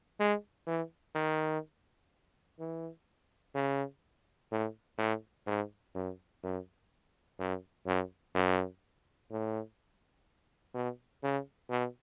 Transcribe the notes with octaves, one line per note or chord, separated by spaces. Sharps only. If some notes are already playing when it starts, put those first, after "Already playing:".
G#3
E3
D#3
E3
C#3
A2
A2
G#2
F#2
F#2
F#2
F#2
F#2
A2
B2
C#3
B2